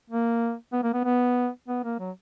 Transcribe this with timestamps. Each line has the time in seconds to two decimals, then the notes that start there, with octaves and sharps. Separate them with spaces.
0.10 A#3
0.73 B3
0.83 A#3
0.94 B3
1.04 B3
1.68 B3
1.84 A#3
2.00 F#3